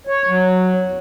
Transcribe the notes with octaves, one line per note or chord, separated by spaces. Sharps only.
C#5
F#3
E2